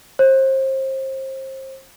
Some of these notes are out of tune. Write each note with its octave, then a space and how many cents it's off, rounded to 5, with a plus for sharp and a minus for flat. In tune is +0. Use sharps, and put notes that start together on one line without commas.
C5 +30